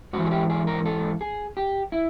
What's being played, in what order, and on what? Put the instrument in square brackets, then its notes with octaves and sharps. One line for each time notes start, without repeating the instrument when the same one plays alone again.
[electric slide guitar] G#2 E3 F#4
G#4
G4
G#4
A#4
A4
G#4
G4
E4